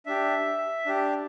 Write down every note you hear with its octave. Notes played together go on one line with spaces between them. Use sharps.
D4 G4 E5
D4 G4